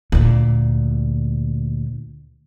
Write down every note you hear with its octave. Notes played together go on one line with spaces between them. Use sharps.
D2 A#2